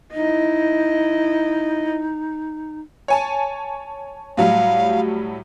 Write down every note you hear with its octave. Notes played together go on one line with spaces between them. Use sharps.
D#4 E4 D#5
C#5 G#5 A5
A2 F#3 G3 F5